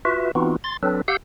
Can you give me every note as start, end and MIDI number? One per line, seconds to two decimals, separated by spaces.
0.05 0.31 65
0.05 0.31 66
0.05 0.31 71
0.05 0.31 76
0.35 0.56 52
0.35 0.56 59
0.35 0.56 60
0.35 0.56 63
0.35 0.56 65
0.35 0.56 66
0.64 0.77 84
0.64 0.77 93
0.83 1.02 54
0.83 1.02 60
0.83 1.02 62
0.83 1.02 69
0.83 1.02 71
1.08 1.17 67
1.08 1.17 77
1.08 1.17 78
1.08 1.17 88
1.08 1.17 91